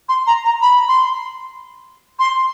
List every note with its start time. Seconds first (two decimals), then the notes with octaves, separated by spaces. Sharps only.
0.09 C6
0.27 A#5
0.45 A#5
0.62 B5
0.88 C6
2.19 C6